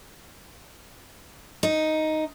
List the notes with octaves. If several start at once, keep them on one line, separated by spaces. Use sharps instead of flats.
D#4